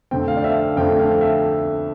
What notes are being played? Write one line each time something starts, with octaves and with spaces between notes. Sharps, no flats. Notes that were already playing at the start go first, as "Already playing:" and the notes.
F2 D3 A3 C4 G5
F5
D5
E5
F5
F2 D3 A3 C4 G5
F5
E5